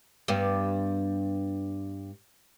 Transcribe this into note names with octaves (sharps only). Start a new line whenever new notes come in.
G2 B3